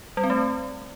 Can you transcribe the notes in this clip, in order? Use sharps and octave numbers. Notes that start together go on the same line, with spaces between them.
G3
C4
A3